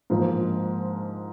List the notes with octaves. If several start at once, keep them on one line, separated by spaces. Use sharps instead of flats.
G#2 F3 A#3